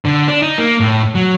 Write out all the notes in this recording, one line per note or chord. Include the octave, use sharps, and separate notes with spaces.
D3
D4
D#4
A#3
A2
F#3